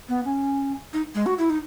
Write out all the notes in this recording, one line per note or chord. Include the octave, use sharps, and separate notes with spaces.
B3
C#4
D#4
G#3
F#4
E4
D#4